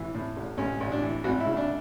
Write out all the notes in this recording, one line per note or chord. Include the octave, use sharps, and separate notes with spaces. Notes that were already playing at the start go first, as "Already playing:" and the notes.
Already playing: A1 E3
A2
A1
A1 C#4
A1
D4
E3
G#1 F#4
E4
C#3
D4